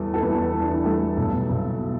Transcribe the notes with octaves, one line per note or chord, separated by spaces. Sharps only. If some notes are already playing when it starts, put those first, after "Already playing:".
Already playing: E2 E3 G3 A4
A4
E2 B3 B4
E3 E4
D4
E4
G3 A3 A4
B1
B1
B2